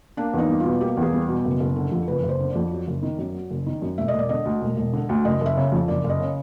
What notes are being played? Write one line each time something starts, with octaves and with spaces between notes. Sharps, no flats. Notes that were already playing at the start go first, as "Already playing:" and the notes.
A#3 D4
E2 D#4
G3
F4
B2
A#3 G4
E2
G#4
G3
B2
F#1
F#1
D3
F2
F#1 B4
F#1
C5
D3
D5
F2
F#3
F#1
D#3
F#2
F#3
F#1
D#3
F#2
E1 E5
D#5
E1 D5
D3 D#5
D2
E1
E1
D3
D2
F#1 D#5
F#1 E5
C#3
F2
F#1 D5
F#1
D#5
C#3